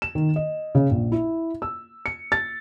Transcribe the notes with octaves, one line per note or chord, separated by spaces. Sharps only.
E7
D#3
D#5
C#3
A#1
E4
E6
C#7
A6